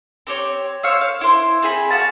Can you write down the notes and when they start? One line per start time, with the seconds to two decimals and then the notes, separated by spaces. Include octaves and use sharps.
0.27 C4 G4 C#5
0.83 C5 C#5 F5 E6
1.01 F5
1.21 E4 C5
1.62 C4 G#4 B5
1.90 F#4 F5 A5